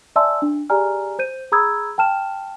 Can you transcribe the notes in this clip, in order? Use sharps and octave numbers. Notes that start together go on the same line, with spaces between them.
D5 E5 G#5 A5 C6 E6
D4
G4 G#4 D5 G#5 A#5 F6
C5 G6 D#7
G#4 A#5 B5 D#6 E6 G#6
G5 A5 F6 E7